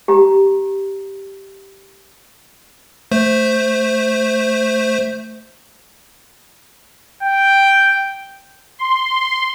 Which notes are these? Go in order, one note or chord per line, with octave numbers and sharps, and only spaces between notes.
G4 A#5
A3 C5
G5
C6